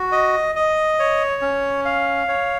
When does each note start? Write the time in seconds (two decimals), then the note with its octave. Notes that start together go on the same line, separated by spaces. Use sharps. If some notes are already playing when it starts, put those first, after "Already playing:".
Already playing: F#4
0.12 D#5
0.55 D#5
0.99 C#5
1.42 C#4
1.85 F5
2.29 C#5